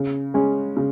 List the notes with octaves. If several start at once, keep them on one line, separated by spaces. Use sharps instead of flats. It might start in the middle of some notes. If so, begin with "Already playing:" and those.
Already playing: C#3
G#3 C#4
C#3